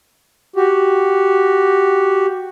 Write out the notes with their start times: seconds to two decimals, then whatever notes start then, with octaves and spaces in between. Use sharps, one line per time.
0.56 F#4 G4